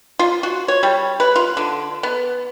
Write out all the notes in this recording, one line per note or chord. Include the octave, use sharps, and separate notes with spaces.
F4
F#4
C#5
G3
B4
F4
D3
B3